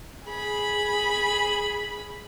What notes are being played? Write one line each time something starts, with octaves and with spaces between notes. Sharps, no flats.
G#4 B5